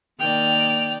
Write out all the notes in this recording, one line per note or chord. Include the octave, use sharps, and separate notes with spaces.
D#3 A#3 D5 G5 F7